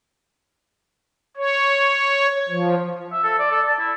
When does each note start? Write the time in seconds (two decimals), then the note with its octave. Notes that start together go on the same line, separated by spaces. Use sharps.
1.37 C#5
2.49 F3
3.12 E5
3.23 A4
3.39 D5
3.51 A4
3.66 A5
3.79 E4